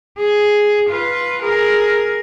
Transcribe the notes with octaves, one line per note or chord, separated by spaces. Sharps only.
G#4
F4 B4
G#4 A#4